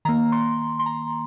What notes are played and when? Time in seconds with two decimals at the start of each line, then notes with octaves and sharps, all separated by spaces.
0.05 D#3 A#3 A#5
0.32 C6
0.79 C6
0.86 A#5